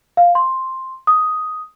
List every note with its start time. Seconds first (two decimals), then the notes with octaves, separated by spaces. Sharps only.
0.17 F5
0.35 C6
1.07 D#6